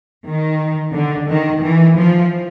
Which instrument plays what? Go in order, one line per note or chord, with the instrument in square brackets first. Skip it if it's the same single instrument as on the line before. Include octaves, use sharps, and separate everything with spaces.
[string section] D#3
D3
D#3
E3
F3